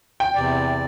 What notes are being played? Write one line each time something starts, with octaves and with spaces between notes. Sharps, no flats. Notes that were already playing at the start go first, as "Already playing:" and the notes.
G5
E2 C3 D5